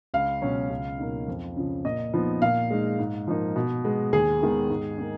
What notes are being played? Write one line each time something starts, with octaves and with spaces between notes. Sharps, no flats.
C#2 F5
B2 F#3 C#4
C#2
B2 F#3 A#3 D#4
F2
C#3 F3
A#2 D#5
F3 B3 D#4
A#2 F5
G#3 D#4
G#2
F3 A#3 D#4
B2
G#3 B3
D#2 G#4
D#3 G#3 B3
G#2
A#3 D#4